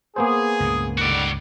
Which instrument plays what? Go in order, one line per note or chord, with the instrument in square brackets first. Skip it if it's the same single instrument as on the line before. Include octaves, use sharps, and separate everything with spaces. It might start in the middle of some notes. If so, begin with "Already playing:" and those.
[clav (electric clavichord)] A#3 B3 C5 [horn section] G#4
[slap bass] C#2 G2 A#2
[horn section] D3 D#3 G3 [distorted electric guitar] F#4 D5